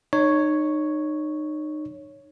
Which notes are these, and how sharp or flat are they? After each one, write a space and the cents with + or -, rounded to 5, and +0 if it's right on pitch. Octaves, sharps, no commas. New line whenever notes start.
D#4 -30 C#5 +0